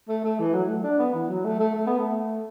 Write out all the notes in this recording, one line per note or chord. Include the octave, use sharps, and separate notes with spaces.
A3
A3
E3
F#3
A3
D4
B3
E3
F#3
A3
A3
A3
B3
A3